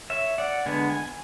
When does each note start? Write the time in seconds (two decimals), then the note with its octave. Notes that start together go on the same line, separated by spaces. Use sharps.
0.10 C#5 E5
0.38 D5 F#5
0.66 D3 G#3 B3 G#5
0.90 G#5